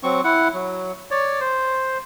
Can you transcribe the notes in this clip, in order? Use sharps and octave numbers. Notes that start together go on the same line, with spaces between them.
F#3 C4 C#6
E4 F#5
F#3
C#5 D5
C5